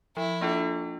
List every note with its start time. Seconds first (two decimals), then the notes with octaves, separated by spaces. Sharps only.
0.17 F3 E4
0.41 A#3 D4 F4 A4